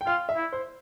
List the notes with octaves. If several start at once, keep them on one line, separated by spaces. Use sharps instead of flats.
G5
F4 F5
E5
E4
C5